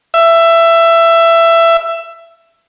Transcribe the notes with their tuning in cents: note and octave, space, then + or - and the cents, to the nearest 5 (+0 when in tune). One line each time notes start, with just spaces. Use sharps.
E5 +15